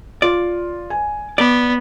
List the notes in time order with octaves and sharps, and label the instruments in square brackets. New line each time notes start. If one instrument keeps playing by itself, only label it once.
[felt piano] F4 [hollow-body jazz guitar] D5
[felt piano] G#5
[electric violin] B3 [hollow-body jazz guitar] D5